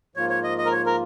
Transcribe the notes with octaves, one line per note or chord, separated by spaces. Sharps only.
G#2 F3 A#3 F4 C#5
C#5
D#5
D#5
A#4
C#5
A#4